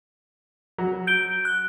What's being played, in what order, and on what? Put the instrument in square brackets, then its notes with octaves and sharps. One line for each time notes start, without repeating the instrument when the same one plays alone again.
[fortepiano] F#3
[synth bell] G6 D7 G7
F#6